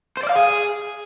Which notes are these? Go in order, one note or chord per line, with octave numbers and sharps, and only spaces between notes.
C5
D5
F5
G#4